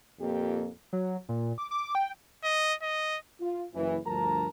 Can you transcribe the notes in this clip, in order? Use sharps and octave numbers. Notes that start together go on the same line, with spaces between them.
F2 A#2 A#3 G4
F#3
A#2
D6
D6
G5
D#5
D#5
F4
F#1 E3
D2 G2 F3 A#4 A5 A#5